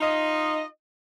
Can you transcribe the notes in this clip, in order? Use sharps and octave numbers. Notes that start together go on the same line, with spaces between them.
D#4 F4 D#5